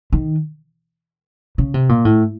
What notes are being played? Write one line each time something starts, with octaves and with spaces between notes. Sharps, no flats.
D#3
C#3
C3
A#2
A2